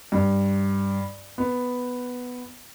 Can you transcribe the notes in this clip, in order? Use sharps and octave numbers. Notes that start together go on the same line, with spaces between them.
G2
B3